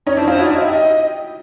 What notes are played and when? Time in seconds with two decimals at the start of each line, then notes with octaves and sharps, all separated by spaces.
0.07 C#4 D#4 C#5
0.17 D4 E4 C5
0.28 D#4 F4 C5
0.39 E4 F#4 C#5
0.46 D5
0.55 F#4 D#5
0.63 E5
0.68 G4 D#5